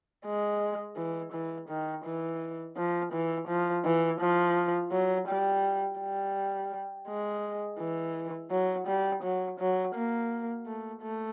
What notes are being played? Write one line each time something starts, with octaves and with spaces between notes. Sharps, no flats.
G#3
E3
E3
D#3
E3
F3
E3
F3
E3
F3
F#3
G3
G3
G#3
E3
F#3
G3
F#3
F#3
A#3
A3
A3